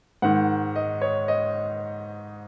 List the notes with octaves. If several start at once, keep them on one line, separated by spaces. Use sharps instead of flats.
G#2 D#3 F#5
D#5
C#5
D#5